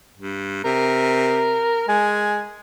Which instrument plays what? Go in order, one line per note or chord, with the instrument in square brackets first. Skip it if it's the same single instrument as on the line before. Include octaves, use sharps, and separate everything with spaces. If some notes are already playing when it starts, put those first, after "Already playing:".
[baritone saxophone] G2
[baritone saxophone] C3 [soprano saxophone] A#4
[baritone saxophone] G#3 [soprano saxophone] G#5